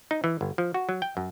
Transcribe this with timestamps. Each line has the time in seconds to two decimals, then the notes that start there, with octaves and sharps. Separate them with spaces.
0.11 D#4
0.24 E3
0.41 G1
0.58 F3
0.74 F#4
0.89 F#3
1.02 G5
1.17 F#2